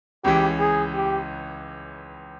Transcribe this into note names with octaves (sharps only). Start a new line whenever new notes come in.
C#2 C#3 E3 G4
G#4
G4